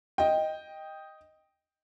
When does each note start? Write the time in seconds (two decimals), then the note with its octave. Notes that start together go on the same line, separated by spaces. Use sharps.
0.18 D#5 G5